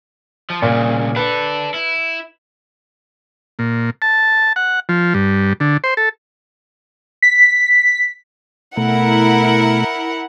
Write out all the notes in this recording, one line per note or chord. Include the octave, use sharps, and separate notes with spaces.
F3
C2 A#2 C#3
D4 A4 B4
E4
A#2
A5
F#5
F3
G2
D3
C5
A4
B6
B2 A3 E4 A#4 F#5